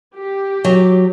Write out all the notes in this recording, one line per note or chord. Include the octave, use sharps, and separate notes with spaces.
G4
F#3